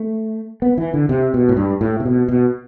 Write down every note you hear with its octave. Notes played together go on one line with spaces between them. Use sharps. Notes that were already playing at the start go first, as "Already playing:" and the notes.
Already playing: A3
B3
E3
D3
C3
B2
A2
G2
A2
C3
B2
B2